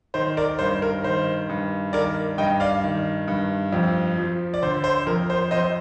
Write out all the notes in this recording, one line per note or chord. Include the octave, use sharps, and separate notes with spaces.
D#3 C5
A#4 D5
G2 C5
A#4
D#3 C5
G2
D#3 A#4 D5
G2 D#5 G5
D5 F5
D#3
G2
F2
F3
D5
D3 C5
C5
F2 A#4
C5
F2 C5 D#5